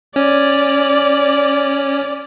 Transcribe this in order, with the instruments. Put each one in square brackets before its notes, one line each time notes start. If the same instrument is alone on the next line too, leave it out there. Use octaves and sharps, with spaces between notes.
[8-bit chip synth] C#4 [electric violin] D5